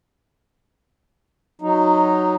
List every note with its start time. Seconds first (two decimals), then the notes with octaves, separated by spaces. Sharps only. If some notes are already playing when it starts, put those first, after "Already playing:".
1.62 F#3 D#4